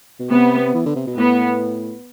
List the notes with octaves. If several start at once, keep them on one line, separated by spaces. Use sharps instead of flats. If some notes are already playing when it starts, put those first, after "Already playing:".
B2
C3 B3
E3
D3
C3
B2
A2 B3